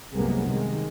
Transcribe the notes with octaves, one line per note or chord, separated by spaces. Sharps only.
C2 F#2 C3 G#3 A#3 B3
C3 D#3 G#3